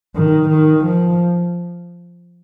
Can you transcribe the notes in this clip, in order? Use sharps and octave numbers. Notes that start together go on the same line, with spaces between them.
D#3
D#3
F3